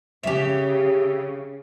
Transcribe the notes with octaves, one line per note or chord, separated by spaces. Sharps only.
C#3 G4 E5